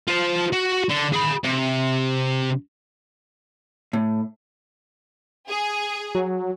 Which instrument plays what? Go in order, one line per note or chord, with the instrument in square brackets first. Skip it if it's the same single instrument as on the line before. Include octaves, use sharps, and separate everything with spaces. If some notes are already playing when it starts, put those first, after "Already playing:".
[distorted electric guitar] F4 C5
F#4
D3
G#4 B5
C3
[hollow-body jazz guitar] A2
[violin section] G#4
[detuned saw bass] F#3